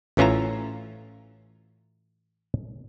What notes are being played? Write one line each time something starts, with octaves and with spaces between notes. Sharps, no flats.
A1 E3 C#4 F4 E5 A#5